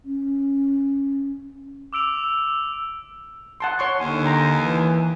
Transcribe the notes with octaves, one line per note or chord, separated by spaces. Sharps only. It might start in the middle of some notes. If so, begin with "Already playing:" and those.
C#4
D6 E6 D7 F7
F#5 A5 C6
C#5 C6 C#6
D#2 D3 G#5
G5 A#5 C6
E3